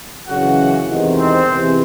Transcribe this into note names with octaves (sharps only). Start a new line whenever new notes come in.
F#2 C#3 E3 F#4 F#5
E2 C3 D#3 G#3
C4 C5
E2 C3 E3 G#3